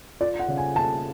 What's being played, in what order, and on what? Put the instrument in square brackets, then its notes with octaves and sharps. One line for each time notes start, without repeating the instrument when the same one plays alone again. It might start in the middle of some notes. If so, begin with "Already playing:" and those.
[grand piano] F4 [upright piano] D5
[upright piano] F#5
[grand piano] C#3
[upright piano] G#5
[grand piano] C#3 [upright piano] A5